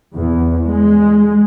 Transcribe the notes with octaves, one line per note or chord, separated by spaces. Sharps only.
E2
G#3